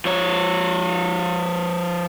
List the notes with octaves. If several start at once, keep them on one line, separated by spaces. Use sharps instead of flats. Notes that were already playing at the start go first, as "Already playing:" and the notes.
F3 C#5